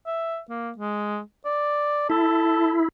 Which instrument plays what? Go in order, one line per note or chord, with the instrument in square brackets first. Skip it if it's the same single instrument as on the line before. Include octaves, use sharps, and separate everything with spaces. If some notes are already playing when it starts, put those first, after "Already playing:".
[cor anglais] E5
A#3
G#3
D5
[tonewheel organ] E4 [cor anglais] A4